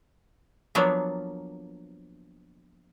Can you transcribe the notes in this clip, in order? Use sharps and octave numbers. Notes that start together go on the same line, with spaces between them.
F3 F#3 A#3 B3 D4